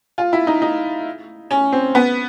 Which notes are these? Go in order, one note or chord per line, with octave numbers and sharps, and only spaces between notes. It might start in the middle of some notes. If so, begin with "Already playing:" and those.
F4
E4
D#4
D#4
C#4
C4
B3